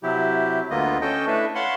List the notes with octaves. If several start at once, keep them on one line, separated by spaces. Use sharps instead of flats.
C3 F#3 E4 G4
D2 D3 A#3 B3 F4 D#5
C#4 A4 D#5 G5
A3 D4 E4 A4 B4
C#5 F5 F#5 A5 B5 C6